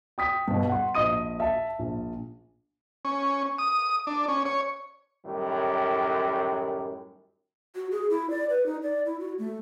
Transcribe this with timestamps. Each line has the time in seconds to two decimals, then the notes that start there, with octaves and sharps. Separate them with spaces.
0.18 G5 D#6 B6
0.48 G2 B2
0.69 F#5 C6
0.95 A#1 D#5 D#6 D#7
1.40 E5 A5
1.79 A#1
3.05 C#4
3.59 D#6
4.07 D4
4.28 C#4
4.45 C#5
5.25 F#2 A2 D#3 G3
7.75 F#4
7.91 G#4
8.10 E4
8.30 D5
8.50 B4
8.66 D#4
8.83 D5
9.06 E4
9.20 F#4
9.39 A3